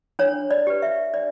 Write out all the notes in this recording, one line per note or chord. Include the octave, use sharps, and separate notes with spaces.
D4 C#5
D5
G4 B4
E5
D4 D5